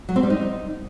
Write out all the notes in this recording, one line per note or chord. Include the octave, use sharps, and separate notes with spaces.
F#3
C4
G3
D#4